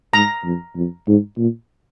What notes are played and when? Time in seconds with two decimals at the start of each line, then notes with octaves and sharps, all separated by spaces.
0.13 G#2 A#5
0.44 F2
0.76 F2
1.07 G#2
1.38 A#2